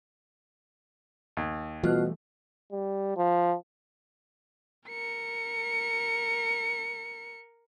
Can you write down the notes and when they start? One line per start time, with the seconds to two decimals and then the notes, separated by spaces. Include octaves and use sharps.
1.37 D#2
1.83 B2 E3 F3 G3 A3 F4 F6 F#6
2.72 G3
3.17 F3
4.88 A#4 C#7